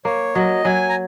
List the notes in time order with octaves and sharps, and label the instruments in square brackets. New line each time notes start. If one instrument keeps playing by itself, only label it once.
[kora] A#3 [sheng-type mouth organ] C#5
[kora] F#3 [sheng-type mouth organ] D#5
[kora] F#3 [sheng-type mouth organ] G#5
[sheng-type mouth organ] A#5